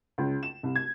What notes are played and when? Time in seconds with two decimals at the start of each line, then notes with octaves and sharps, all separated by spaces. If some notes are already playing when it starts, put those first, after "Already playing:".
0.18 C#2
0.43 E7
0.63 C2
0.76 G#6